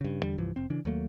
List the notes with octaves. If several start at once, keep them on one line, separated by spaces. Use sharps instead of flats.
G2 C#3
E2 D3 G3
C2 G2 E3 F3
F1 C4
C#3 E3 D4
D#2 F#3 A3 A#3